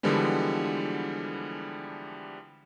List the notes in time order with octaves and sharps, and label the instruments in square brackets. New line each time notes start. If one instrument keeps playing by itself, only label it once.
[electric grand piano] D3 E3 F3 G3 G#3 B3